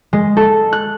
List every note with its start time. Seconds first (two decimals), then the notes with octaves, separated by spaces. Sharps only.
0.13 G#3
0.37 A4
0.73 F#6